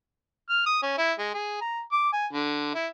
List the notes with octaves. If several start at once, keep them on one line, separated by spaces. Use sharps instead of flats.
F6
D#6
C#4
E4
G#3
G#4
A#5
D6
G#5
D3
E4